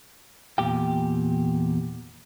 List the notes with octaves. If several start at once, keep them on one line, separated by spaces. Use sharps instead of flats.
E2 A#2 G4 G5